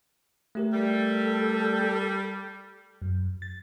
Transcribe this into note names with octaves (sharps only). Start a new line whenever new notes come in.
A3 G4 A#4
G3 A4
F#2
A6